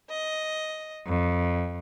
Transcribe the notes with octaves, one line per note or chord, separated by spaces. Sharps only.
D#5
F2